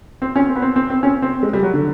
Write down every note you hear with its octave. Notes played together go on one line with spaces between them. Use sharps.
C4
C#4
C4
B3
C4
C4
C4
C#4
C4
G#3
G3
F#3
D3